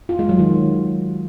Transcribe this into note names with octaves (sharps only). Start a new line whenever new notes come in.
F4
G#3
F#3
D#3